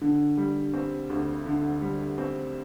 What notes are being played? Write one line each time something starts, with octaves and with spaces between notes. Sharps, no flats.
D3
G3
C4
D2
D3
G3
C4